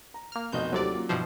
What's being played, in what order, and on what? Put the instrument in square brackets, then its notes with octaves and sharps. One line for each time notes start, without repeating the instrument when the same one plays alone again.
[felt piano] A#5
[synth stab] A#3 F6
[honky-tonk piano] F1 D#5 [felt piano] B1 B3 F#4 [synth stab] G6
[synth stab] D#2 C3 D5 [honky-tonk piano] F#3 [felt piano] A3 F4
[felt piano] A#3 C#4 F4
[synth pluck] G2 B2 F3 [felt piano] E3 [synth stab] C5